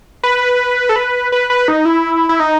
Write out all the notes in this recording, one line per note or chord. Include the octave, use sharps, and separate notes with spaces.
B4
A4
B4
B4
B4
D#4
E4
E4
D#4